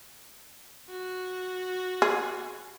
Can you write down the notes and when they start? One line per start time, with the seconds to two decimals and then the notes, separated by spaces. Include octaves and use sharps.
0.90 F#4
2.02 G#4